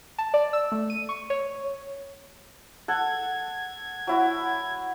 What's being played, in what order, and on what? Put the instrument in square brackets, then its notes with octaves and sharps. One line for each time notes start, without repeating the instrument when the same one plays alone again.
[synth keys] A5
D5
E6
A3
D#7
C#6
C#5
[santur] A4 F#5 [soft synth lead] G#6
[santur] F#3 E4 F#4